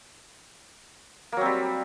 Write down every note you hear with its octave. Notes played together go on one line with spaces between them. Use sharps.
F#3 G3 A#3 C4